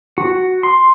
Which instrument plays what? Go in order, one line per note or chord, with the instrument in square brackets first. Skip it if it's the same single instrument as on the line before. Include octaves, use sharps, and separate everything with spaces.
[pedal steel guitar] F#4
C6